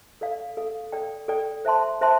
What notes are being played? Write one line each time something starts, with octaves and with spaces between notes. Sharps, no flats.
A4 D5 F5
A4 D5 F5
A4 D5 G5
A4 D5 G5
C5 E5 A5 C6
C5 E5 A5 C6